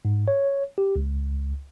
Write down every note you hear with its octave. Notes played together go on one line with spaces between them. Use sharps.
G#2
C#5
G4
C#2